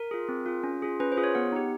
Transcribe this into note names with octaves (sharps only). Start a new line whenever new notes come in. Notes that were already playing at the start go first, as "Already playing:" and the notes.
Already playing: A#4
F4 G#4
C4
F4 G#4
C#4
F4 G#4
C#4 B4
C5
F4 G#4
C#5
B3 F#5
D#4 G4